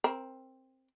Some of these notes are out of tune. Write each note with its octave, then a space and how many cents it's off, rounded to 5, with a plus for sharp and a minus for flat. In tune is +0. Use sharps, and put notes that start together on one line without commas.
C4 +10 A#4 +0 B5 -45